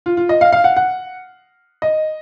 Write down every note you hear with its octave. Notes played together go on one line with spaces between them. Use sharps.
F4
F4
D#5
F5
F5
F#5
F#5
D#5